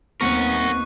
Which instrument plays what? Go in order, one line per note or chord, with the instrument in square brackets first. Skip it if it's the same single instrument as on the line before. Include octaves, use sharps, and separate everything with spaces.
[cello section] D#2 B3 [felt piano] C4 [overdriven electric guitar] A#4 F#5 [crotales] C#6 F#6